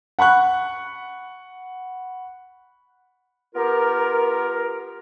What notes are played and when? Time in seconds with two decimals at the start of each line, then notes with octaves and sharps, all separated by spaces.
0.19 F#5 B5 C#6 F#6
3.54 B3 F4 G4 A#4